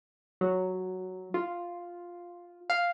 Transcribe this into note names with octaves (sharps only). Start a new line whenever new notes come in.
F#3
F4
F5